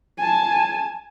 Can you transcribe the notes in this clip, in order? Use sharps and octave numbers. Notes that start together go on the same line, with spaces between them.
G#5 A5